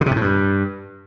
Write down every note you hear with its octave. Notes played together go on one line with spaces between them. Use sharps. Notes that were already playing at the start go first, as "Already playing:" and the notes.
D3
C3
G#2
A2
G2